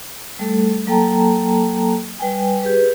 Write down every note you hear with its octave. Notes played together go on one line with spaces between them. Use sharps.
G3 A3 A4
F#3 A#3 A4 G5 A5 A#5
G3 B4 G5 G#5
G4 G#4 B4